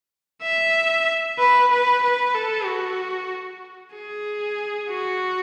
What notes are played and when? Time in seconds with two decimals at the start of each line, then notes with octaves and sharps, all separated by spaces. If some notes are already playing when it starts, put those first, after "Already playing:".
0.42 E5
1.38 B4
1.71 B4
2.03 B4
2.35 A4
2.66 F#4
3.94 G#4
4.89 F#4